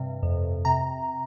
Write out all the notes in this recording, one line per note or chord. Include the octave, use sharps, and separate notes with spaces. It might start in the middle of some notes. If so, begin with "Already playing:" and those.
Already playing: G2 C3
F2
C3 A#5